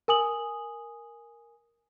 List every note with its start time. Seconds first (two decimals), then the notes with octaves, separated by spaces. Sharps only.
0.08 A#4 G#5 D#6 F#7